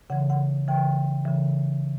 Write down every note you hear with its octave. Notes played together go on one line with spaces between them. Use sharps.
C#3 E3 F#5
F#5
C#3 E3 G5
C#3 E3